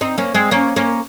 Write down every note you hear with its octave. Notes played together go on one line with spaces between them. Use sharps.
C4 D#4
A#3 C#4
G#3 C4
A#3 C#4
A#3 C#4